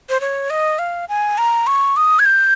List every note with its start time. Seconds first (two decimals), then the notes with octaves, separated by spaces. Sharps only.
0.09 C5
0.21 C#5
0.50 D#5
0.79 F5
1.09 G#5
1.38 A#5
1.67 C#6
1.96 D#6
2.19 G#6
2.25 G6